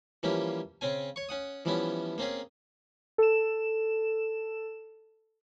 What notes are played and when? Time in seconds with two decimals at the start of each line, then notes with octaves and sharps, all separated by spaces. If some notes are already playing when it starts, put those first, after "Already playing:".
0.23 E3 F3 G3 A#3 C#4 G4
0.81 C#3 C4 C#4 G#5
1.16 C#5 C#6
1.29 C#4 F#5 D#6
1.65 E3 F3 G3 B3 C#4 E4
2.18 A#3 C4 C#4 G#4
3.18 A4 E7